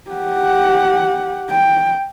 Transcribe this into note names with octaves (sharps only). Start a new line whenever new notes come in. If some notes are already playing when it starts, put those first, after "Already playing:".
G4 F#5
G5